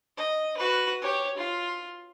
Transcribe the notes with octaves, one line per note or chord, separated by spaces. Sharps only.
D#5
F#4 B4
G4 C#5
F4